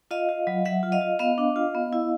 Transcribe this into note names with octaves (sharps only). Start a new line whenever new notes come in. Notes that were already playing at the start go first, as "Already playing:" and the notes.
F4 D#5 F5
F4
F#3
F#3 E5 F#5
F4
D#5 F5
F4
B3 D#5 F5
D4
F4
B3
E4